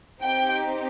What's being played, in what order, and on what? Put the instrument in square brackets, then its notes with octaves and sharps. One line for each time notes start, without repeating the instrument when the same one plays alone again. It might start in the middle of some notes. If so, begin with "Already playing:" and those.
[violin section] C4 D#4 G4 G5